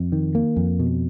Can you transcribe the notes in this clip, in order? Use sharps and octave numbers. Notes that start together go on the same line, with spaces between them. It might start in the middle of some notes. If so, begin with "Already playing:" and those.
Already playing: F2
D#3
A#3
F2
B2